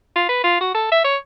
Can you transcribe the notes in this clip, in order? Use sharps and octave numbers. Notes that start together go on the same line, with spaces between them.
F4
B4
F4
F#4
A4
E5
C#5